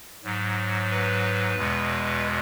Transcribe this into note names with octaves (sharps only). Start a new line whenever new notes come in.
G#2 F#3
B4
E2 B2 G#3